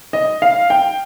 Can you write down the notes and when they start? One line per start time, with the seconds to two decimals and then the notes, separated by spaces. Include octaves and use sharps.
0.13 D#5
0.42 F5
0.70 G5